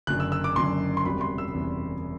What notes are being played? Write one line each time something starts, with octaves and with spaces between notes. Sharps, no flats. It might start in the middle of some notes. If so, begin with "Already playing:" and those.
F#1 F#2 D3 F#6
E6
E6
D6
F#1 F#2 D3 C6
C6
E1 E2 C3 G3 B5
C6
E6
E1 E2 C3 G3